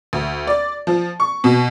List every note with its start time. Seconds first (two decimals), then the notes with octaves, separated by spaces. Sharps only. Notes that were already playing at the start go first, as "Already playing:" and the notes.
0.13 D2
0.47 D5
0.87 F3
1.20 C#6
1.44 B2